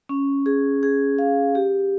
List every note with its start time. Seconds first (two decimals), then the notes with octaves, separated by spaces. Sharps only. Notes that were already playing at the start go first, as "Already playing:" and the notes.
0.09 C#4
0.46 G#4
0.83 G#4
1.19 F5
1.55 G4